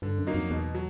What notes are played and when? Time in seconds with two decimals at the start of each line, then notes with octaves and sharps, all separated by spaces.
0.02 G2 D3
0.18 F#2
0.27 F#3 A#3 D#4
0.34 F2
0.50 E2 B2
0.75 F#3